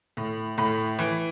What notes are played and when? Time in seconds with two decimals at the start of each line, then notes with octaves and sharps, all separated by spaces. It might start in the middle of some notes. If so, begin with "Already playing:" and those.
0.17 A2
0.58 A2 B5
0.99 E3